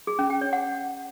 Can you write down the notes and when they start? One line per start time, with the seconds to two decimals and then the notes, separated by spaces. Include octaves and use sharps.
0.07 G#4
0.19 C#4
0.30 G5
0.41 C#5
0.53 F#5